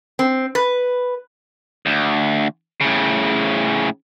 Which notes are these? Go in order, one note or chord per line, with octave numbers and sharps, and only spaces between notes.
C4
B4
D2
A2 C#3